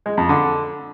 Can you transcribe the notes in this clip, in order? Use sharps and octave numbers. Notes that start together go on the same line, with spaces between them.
G#3
F2
D3